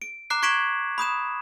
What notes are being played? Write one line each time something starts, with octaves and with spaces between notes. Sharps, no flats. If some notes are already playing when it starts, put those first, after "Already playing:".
D7
A#5 D6 F#6 C7
C#6 G#6 B6 D7 E7 F#7
B5 D#6 G6 E7